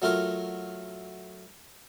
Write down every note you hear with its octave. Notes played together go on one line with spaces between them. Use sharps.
F#3 A3 F4 A#4